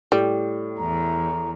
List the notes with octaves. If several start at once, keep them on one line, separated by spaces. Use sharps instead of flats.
A2 G3
E2 A#5